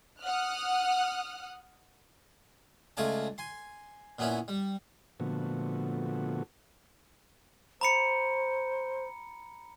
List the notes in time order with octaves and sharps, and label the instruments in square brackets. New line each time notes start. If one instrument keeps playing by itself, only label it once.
[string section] F#5 D#6 F6 F#6
[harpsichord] C#2 A3 F4 D5 G#5 A5
G#5 C6
A#2 B3 C#4 E4
G3
[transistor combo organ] A#2 D3 F3 A3 B3 F#4
[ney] C5 [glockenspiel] A#5 B5 C#7